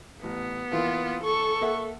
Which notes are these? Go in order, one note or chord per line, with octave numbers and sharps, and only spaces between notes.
A1 B3
E3 A#3 F4
A4 C#6
A#3 E5 F#5